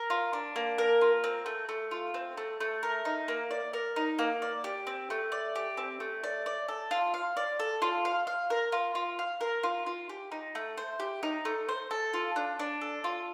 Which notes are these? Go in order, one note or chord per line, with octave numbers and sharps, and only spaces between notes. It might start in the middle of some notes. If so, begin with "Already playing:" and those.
Already playing: A#4
F4
D4
A#3
A#4
F4
C4
A3
A3
F4
C4
A3
A3
A#4
D#4
A#3
D5
A#4
D#4
A#3
D5
G4
C4
A3
D5
G4
C4
A3
D5
D5
A4
F4
F5
D5
A4
F4
F5
F5
A#4
F4
F4
F5
A#4
F4
F4
G4
D#4
A3
C5
G4
D#4
A3
C5
A4
F4
D4
D4
A4
F4